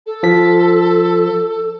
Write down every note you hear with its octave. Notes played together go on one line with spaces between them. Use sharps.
A4
F3 B6